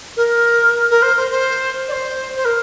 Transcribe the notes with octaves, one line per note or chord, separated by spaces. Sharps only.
A#4
A#4
C5
C5
C5
D5
C5
C5
A#4